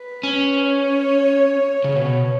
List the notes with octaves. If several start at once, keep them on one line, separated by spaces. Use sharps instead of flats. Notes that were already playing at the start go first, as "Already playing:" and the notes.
Already playing: B4
C#4
C#5
C#3
B2 C#5